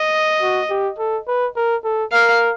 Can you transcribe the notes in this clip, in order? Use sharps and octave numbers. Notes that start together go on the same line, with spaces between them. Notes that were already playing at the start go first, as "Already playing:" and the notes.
Already playing: D#5
F#4
G4
A4
B4
A#4
A4
A#4 F5